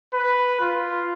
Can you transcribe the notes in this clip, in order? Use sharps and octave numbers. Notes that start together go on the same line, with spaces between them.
B4
F4